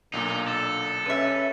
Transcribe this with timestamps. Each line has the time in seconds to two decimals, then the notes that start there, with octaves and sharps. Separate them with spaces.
0.13 B1 A#2 D3 A#3 D#4
0.48 A4
1.06 C#4 B4 E5